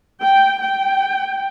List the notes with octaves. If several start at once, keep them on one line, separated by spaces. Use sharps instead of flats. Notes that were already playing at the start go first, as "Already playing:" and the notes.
G5
G5